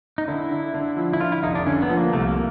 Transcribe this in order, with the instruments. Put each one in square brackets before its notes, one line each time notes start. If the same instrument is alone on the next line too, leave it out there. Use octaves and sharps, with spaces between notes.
[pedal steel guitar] D#4
[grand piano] D3 [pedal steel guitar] E4
[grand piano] D3
D3
F3
[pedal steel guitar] E4
[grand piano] D3 [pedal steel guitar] F4
[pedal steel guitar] E4
[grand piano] F1 [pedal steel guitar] D#4
[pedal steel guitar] D4
[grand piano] D3 [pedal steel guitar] C#4
[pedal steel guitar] B3
[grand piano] F3
[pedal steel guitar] A#3
[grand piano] C2 [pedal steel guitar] A3
[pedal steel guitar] A#3